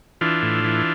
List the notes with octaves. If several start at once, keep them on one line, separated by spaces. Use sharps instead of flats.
E3 D4 F4
A2
E3